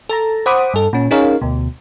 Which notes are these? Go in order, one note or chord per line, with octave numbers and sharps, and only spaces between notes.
A4 A5 A#5
C5 F#5 B5 D6 D#6
G2 A4
A#2 C#4
C#4 D#4 G#4 A#4 C#5 F5
D2 B2